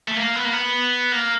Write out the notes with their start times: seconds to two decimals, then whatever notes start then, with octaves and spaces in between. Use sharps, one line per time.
0.08 A3
0.16 A#3
0.35 B3
0.45 A#3
0.53 B3
1.12 A#3